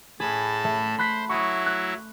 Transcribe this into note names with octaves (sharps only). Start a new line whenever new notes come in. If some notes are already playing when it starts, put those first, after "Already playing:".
A2 G#4 A5 B5
A3
C5 B5 F#6 B6
F#3 E4 F#4 C#6 D#6
F#6